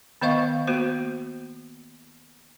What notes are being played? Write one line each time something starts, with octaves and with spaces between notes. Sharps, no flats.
D#3 B3 C5 D#5 F5 C#6
A#3 B3 F#4 C5